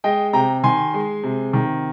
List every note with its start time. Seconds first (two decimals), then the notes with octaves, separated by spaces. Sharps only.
0.04 G#3 D#5 G5
0.33 C3 G5 A#5
0.63 D#3 G#5 C6
0.94 G#3
1.23 C3
1.53 D#3